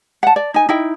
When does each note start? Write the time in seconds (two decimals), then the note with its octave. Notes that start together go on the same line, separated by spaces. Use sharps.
0.23 F#5 A5
0.36 D5
0.54 D#4 G#5
0.69 D#4 E4 G5